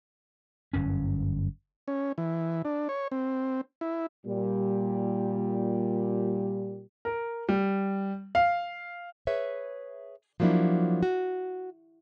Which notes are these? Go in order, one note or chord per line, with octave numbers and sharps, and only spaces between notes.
G1 F#2 C#4
C#4
E3
D4
C#5
C4
E4
A#2 G3
A#4
G3
F5
G#4 B4 C#5 E5
F3 F#3 A#3 D4 E4
F#4